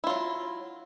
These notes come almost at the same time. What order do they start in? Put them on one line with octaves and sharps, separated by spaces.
E4 F4 F#3